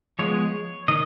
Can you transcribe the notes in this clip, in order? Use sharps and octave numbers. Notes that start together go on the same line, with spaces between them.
F3 G#3 B3 C#5
D#3 D#5